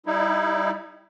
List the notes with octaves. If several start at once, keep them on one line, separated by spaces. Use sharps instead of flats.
G3 D#4 E4